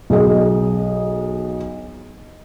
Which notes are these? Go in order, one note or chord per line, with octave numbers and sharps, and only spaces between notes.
B1 G#4 D#5